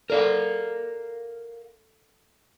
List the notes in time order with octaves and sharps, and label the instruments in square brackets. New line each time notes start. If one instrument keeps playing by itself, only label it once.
[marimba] A4 D5 [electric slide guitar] A#4 F5 F#5